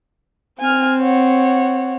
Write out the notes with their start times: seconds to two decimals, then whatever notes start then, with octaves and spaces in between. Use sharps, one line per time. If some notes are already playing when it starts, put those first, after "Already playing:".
0.60 C4 G#5 F6
1.01 C#5 F#5